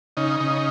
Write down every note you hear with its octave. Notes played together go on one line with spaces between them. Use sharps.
C#3 D#4
C#3